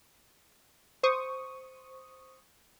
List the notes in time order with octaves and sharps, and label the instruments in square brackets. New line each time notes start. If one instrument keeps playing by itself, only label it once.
[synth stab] C5 C#6 D#6